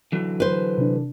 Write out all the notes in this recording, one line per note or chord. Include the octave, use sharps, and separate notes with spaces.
D3 E3 F#3
B4 C5
C3 D4